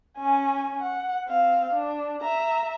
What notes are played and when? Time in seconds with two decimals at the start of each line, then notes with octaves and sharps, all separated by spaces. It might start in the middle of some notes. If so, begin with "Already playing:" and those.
0.17 C#4 G#5
0.82 F#5
1.28 C4 F5
1.74 D4
2.21 E5 A#5